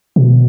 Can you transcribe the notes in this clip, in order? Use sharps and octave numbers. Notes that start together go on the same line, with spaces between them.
B2